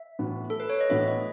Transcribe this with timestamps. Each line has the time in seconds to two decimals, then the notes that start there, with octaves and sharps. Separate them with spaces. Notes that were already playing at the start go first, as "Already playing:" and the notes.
Already playing: E5
0.19 A2 E3 B3 F#4
0.50 A4
0.60 B4
0.70 C#5
0.81 D#5
0.89 A2 E3 B3 F#4 E5
1.08 D#5